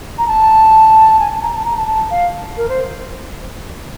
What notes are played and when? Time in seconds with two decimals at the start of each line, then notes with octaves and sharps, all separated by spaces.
0.18 A#5
0.28 A5
1.20 G#5
1.31 A5
1.42 A#5
1.54 A5
1.65 A#5
1.77 A5
1.87 A5
2.11 F5
2.57 A#4
2.69 C5